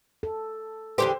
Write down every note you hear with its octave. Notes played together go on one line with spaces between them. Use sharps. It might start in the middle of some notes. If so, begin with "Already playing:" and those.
A4
E2 D3 G4 C5